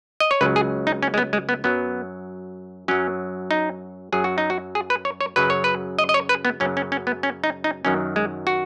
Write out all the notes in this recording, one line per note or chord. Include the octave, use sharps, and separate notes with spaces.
D#5
C#5
C#2 C#3 F#3 B4
G#4
D#4
C#4
G#3
B3
G#3
B3
F#2 F#3 B3
F#2 F#3 C#4
D#4
F#2 F#3 G#4
F#4
D#4
F#4
G#4
B4
C#5
C#5
F#2 C#3 F#3 B4
C#5
B4
D#5
D#5
C#5
B4
B3
F#2 C#3 F#3 C#4
C#4
C#4
B3
C#4
D#4
D#4
F#2 D#3 F#3 C#4
G#3
F#4